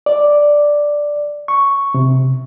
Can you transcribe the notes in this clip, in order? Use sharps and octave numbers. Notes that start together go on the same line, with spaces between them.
D5
C#6
C3